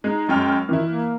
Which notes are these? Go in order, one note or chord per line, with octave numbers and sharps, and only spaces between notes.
G#3 D#4
F#2 G#3 G5 F6
D#3 E3 E4
A#3